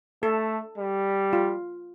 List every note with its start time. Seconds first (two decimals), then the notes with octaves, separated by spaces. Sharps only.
0.23 A3 A4
0.78 G3
1.33 F4